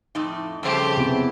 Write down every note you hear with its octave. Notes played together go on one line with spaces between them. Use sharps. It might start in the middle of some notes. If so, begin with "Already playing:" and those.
F2 A2 D#4
F2 C#3 G3 A3 G4 C5
C3 B3 E4